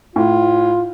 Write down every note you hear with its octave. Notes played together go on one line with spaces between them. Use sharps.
A2 F4